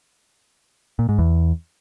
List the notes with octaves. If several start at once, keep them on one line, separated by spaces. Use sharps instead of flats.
A#2
G#2
E2